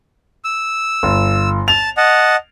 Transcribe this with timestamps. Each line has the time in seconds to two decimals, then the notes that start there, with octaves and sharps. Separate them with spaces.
0.44 E6
1.03 G1
1.68 A5 F7
1.97 D#5 F#5 A5